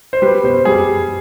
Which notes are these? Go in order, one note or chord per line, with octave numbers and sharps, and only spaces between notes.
C5
G3 B4
B2 C5
G3 G#4